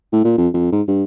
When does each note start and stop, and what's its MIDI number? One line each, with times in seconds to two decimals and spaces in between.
0.12 0.23 45
0.24 0.34 46
0.38 0.49 41
0.54 0.68 41
0.72 0.82 44
0.88 1.04 43